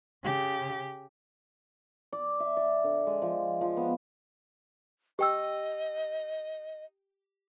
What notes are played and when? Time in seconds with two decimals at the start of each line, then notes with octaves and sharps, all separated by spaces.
0.23 C#3 G4
2.13 D5
2.40 E5
2.57 D5
2.84 D3
3.07 G#3
3.22 F3
3.61 F3
3.77 B3
5.19 G4 D#5 G5 E6